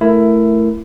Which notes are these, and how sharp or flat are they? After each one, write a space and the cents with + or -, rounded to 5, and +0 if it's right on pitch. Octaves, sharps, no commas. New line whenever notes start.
A3 +0 E4 +15 A#4 +0